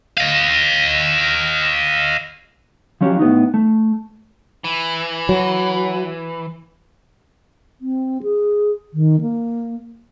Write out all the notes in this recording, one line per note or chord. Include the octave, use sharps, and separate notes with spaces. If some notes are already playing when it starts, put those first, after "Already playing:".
D#5 F5
F3 F#3 C#4 G4
A2 B3 D#4
A3
E3
F#3
C4
G#4
D#3
A#3